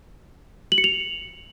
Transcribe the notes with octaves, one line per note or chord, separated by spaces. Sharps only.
F#7
C#7
F7